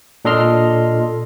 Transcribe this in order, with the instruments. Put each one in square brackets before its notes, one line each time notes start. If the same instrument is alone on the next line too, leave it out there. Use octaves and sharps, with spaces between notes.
[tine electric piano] A#2 D4 A4 D#5 C6 F6